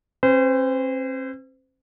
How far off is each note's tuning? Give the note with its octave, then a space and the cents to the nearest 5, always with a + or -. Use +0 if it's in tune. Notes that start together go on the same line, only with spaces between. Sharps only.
C4 +45 C5 -35